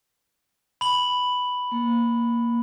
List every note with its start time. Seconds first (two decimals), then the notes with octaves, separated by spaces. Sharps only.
0.81 B5 F#7
1.72 A#3